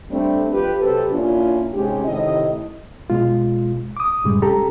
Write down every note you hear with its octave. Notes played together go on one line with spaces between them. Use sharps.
G3 A3 C4 D4
F2 F4 G4 B4
C3 F#3 G4 A4 B4 C5
A#2 A#3 C#4 D4 E4 F4
G#2 C3 G#3 C#4 G4
A2 C3 D#3 E4 D#5
B2 G#3 F4
D6 D#6
F#2 A2 C#3 G3 G#3
C#4 G4 A4 A#5